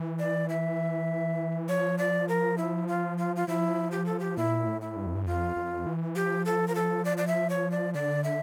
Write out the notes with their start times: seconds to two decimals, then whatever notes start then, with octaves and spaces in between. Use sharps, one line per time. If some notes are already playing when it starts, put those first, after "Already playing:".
Already playing: E3
0.19 D5
0.49 E5
1.69 F3 C#5
1.98 D5
2.29 A#4
2.58 E4
2.88 F4
3.18 F4
3.36 F4
3.48 F3 E4
3.92 G4
4.06 A4
4.20 G4
4.37 A#2 E4
4.66 A2
4.81 E4
4.97 G2
5.06 F2
5.15 G2
5.26 F2 F4
5.56 F2
5.86 E3
6.15 F3 G4
6.45 A4
6.68 A#4
6.75 A4
7.05 D5
7.17 D5
7.27 E5
7.50 C#5
7.72 D5
7.94 D3 D5
8.24 E5